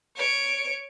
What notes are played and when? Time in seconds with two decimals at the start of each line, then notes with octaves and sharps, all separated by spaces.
0.16 C#5 D7